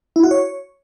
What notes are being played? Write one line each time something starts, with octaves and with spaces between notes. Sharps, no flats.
E4
F#4
C#5